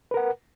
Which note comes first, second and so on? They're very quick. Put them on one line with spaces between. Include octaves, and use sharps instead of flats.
B4 A#4 F#5